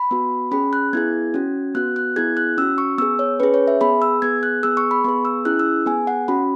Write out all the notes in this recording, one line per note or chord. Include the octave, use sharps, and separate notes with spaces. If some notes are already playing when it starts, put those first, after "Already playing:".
Already playing: B5
B3 F#4
C#4 G#4 B5
F#6
B3 E4 G#4 G#6
C#4 F#4
B3 F#4 F#6
F#6
B3 E4 G#4 G#6
F#6
C#4 F#4 E6
C#6
B3 G#4 E6
C#5
C#4 G#4 B4
C#5
E5
B3 G#4 B5
E6
B3 G#4 G#6
F#6
B3 G#4 E6
C#6
B5
B3 G#4 C#6
E6
C#4 E4 G#4 F#6
E6
B3 G#4 G#5
F#5
C#4 F#4 B5